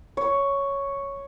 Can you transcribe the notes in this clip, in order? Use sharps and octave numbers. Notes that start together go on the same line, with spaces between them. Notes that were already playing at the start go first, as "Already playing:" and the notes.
C#5